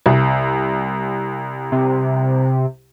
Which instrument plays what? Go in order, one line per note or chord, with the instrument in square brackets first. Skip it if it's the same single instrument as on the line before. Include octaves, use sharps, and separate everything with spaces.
[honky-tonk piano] C2
[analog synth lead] C3